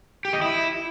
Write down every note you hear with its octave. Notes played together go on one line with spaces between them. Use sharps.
G4
D#5
E4